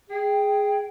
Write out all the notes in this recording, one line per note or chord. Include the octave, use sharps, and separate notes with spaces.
G#4 G5